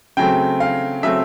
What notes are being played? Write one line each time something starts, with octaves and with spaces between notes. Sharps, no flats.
C#3 F#3 A3 C4 G5
F5
C#3 F#3 A3 C4 E5